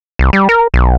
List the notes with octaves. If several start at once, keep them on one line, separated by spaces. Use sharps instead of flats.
C2
G3
A#4
B1